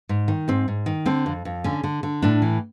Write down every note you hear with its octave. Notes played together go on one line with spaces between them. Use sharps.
G#2
D#3
G#2 C4
G#2
D#3
D3 C4
F2
F2
D3 C#4
D3
D3
A2 D4
E3